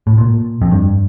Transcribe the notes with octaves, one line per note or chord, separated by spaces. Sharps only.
A2
A#2
F2
G2